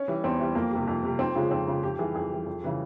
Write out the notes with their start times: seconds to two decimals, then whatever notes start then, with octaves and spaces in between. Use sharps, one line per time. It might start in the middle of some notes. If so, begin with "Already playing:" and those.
Already playing: C#4
0.08 E3 G3
0.24 E2 C4
0.40 E3 G3
0.55 F2 A#3
0.71 C3 G3
0.87 F2
1.03 C3 G3
1.19 F2 C4
1.35 C#3 F3 G#3
1.51 F2 C4
1.67 C#3 F3 G#3
1.83 F2 G4
1.99 E3 G3 G#4
2.15 F2 G#4
2.31 E3 G3
2.46 F2
2.63 C#3 E3 G3